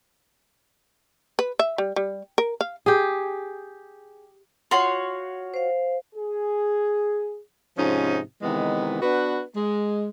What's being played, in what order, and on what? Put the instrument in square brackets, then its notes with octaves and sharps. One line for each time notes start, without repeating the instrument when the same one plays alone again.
[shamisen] B4
E5
G3
G3
A#4
F5
[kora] G4 G#4
[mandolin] F4 F#4 C#5 [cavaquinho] C6
[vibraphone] C5 F5
[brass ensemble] G#4
[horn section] G#2 C3 F3 C#4 D#4
C3 D#3 E3 G#3 B3
B3 D4 F#4 B4
G#3